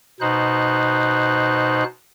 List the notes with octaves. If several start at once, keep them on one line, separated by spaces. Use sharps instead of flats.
B2 D#4 C5 F#6